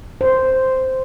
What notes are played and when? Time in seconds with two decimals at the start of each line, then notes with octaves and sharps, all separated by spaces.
0.21 C5